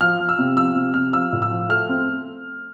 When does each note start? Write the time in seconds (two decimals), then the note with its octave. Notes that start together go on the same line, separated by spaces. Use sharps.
0.01 F3 F6
0.20 F3
0.29 E6
0.39 C3
0.57 F3 E6
0.75 C3
0.94 C3 F6
1.13 F3 E6
1.33 A2
1.42 E6
1.51 F3
1.69 A3 F6
1.89 C4